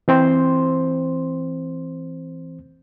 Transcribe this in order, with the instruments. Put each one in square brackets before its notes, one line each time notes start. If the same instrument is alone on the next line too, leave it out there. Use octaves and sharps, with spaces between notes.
[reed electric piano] E3 C4 C5 C6